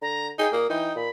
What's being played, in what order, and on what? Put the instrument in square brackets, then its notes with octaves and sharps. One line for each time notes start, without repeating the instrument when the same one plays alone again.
[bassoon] D3 [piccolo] A#5
[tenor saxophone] D#4 [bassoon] G#4 [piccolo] G5
[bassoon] A#2 [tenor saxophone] A#3 [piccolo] D#6
[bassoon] E3 [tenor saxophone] D#4 [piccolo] G5
[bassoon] A#2 [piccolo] B5